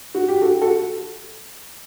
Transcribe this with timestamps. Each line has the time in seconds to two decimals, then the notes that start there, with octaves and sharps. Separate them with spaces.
0.15 F#4
0.28 G4
0.41 F#4 A4
0.62 F#4 A4